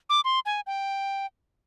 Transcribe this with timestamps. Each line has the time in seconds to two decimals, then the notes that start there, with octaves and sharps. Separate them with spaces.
0.10 D6
0.25 C6
0.46 G#5
0.67 G5